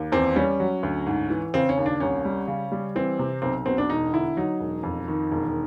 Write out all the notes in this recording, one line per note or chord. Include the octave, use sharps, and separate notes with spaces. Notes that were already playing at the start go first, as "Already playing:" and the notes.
Already playing: D#2
E2 C4
G3 C#4
F#3
D2
G#2
E3
C#3 C4
C#4
D#2
D4
C2 C#4
G3
C#3
G3
E3 C4
C3
B1 C4
B2 C4
D4
E1 D#4
D3 E4
F#3 D#4
E1
F2
D#3
E1